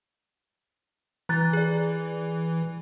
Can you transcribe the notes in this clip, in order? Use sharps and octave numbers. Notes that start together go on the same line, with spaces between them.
E3 A#5 F#6 A6
G#4 D5